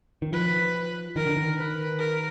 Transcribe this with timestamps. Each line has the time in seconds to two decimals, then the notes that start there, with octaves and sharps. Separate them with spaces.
0.22 D#3
0.32 F3 B4
1.16 D#3 A#4
1.26 D3
1.37 D#3
1.58 B4
1.99 A#4